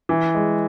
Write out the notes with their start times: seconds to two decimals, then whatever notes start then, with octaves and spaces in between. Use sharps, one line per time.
0.09 E3
0.35 G#3